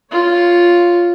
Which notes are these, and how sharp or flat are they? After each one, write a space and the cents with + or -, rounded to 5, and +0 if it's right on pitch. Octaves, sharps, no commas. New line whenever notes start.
F4 +0 C#5 +10